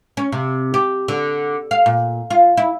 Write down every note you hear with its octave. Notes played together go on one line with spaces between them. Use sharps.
C#4
C3
G4
D3
F5
A#2
F4
E4